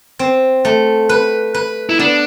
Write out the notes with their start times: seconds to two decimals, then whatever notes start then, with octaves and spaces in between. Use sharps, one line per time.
0.19 C4
0.65 A3
1.09 B4
1.54 B4
1.89 E4
1.99 B3 D4